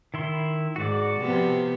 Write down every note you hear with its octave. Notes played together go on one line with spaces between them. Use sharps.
D#3 E4 C6
G#2 F#4 D5
C3 F3 B3